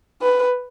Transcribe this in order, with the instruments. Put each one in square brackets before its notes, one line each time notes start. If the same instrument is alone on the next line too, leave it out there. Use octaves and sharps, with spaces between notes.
[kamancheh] B4